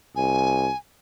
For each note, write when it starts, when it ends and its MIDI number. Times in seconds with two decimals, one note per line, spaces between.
0.16 0.70 36
0.16 0.77 80